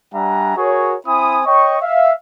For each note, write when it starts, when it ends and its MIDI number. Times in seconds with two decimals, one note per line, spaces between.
0.14 0.57 55
0.14 0.57 62
0.14 0.57 76
0.14 0.57 78
0.14 0.57 80
0.14 0.57 82
0.57 0.97 66
0.57 0.97 68
0.57 0.97 70
0.57 0.97 73
1.07 1.41 60
1.07 1.41 64
1.07 1.41 80
1.07 1.41 83
1.07 1.41 87
1.46 1.77 73
1.46 1.77 75
1.46 1.77 79
1.46 1.77 85
1.82 2.13 76
1.82 2.13 77